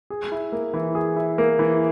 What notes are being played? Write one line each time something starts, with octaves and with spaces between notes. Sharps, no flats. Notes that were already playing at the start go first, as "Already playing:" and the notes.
G#4
E4
A#3
E3
G#4
E4
A#3
E3